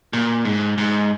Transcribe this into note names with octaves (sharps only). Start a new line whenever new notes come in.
A#2
G#2
G#2